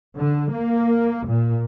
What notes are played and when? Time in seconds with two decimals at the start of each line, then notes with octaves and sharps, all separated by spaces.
0.16 D3
0.51 A#3
1.27 A#2